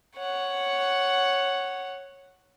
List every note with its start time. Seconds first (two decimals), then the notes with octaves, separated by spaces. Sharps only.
0.17 C#5 F#5